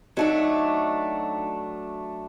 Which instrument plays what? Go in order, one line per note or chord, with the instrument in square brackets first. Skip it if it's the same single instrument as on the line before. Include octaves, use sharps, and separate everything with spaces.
[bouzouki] F#3 A3 D4 [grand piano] D#4